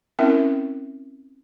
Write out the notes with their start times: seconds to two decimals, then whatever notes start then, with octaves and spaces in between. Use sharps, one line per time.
0.19 C4 C#4 E4 A#4 E5